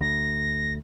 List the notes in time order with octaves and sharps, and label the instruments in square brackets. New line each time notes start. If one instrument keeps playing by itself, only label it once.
[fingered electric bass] D2 [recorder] A#6